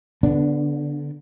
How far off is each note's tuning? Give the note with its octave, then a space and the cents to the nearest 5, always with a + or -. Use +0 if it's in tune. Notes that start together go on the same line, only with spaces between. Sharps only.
D3 -25 B3 +0 D4 +0